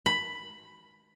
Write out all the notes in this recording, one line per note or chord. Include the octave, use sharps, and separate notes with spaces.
B5